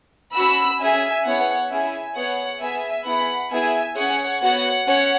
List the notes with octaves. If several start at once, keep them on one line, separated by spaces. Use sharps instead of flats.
C#4 F#4 B5 E6
C#4 G#4 E5 G#5
B3 E4 G#4 C#5 F#5
C#4 E4 G#4 E5 G#5
B3 G#4 C#5 F#5
B3 G#4 E5 G#5
B3 E4 G#4 F#5 B5
B3 E4 G#4 E5 G#5
C#4 G#4 C#5 F#5
B3 F#4 C#5 F#5
C#4 C#5 F#5